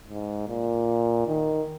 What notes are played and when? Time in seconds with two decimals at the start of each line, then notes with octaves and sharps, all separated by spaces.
0.08 G#2
0.48 A#2
1.28 D#3